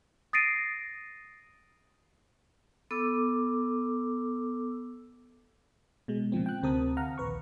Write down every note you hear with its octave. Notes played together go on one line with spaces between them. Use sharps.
D#6 A6 A#6 C7 D7 D#7
B3 A4 D6 E6
B2 G#3
A#2 C#3 F3 C4
G5 F#6
D2 C3 C4 A#4 A5 D#6
F5 F#5 A#5 F6
A#1 D#2 B4 C#6